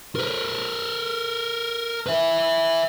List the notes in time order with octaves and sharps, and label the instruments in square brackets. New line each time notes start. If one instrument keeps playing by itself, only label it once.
[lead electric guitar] A#4 B4
B4 E5